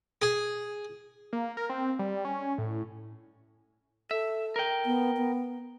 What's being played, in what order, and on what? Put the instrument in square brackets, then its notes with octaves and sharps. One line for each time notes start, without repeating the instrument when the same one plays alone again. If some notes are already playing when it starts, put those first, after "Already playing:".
[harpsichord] G#4
[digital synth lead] A#3
A#4
C4
G3
C#4
A2
[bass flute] A4 [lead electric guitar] E5
[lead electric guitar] A#4 G5
[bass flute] B3
B3